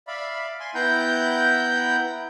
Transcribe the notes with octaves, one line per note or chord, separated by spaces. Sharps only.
D5 E5 F5 B5
G#5 C6
B3 E4 F#5 G5 A#5 G6